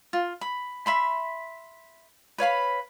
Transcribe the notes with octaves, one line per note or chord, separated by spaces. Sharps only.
F4
B5
E5 B5 C6
B4 C#5 F5 B5